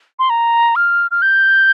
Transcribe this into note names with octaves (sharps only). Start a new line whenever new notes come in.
C6
A#5
F6
F6
G6